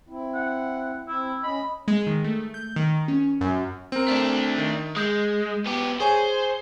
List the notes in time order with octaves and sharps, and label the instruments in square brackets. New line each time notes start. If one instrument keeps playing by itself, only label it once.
[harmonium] C4 E4
[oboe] F#5
[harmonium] C4 [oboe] E4
[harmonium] C#4 D#5 [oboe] B5
[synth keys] G#3
D#3
A3
G6
D#3
C#4
F#2
[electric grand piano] C4 A#4
[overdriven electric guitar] A3 D4
[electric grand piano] D#3
[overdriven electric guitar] G#3 [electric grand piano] D#6 G6
[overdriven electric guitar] B3 G4
[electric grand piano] G#4 C#5 G#5 [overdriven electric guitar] C5